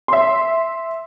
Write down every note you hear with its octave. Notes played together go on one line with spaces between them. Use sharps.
E5 C6